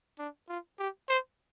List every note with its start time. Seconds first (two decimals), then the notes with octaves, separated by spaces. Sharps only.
0.19 D4
0.49 F4
0.79 G4
1.09 C5